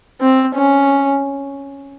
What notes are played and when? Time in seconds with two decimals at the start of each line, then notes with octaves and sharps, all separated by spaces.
0.21 C4
0.55 C#4